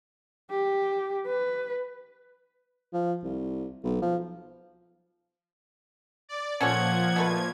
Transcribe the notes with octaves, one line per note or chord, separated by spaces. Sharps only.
G4
B4
F3
C2
B1
F3
D5
A#2 F3 C#4 A4 C#5 F#5 G#6
B2 A3 B4